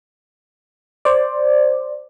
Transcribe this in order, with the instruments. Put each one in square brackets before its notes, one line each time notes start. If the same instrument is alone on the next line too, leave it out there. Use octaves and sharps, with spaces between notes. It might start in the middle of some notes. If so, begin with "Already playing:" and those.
[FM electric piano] C5 D5